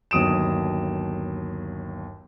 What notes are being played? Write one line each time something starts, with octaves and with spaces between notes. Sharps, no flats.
G1 D#2 F#3 D#6 D7 E7